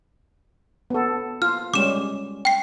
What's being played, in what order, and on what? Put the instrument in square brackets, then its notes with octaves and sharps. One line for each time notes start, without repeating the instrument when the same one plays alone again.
[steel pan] B3 A4
[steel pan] F4 [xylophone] F6
[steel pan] G3 G#3 C#4 [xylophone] D6 E7
[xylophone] G5 C7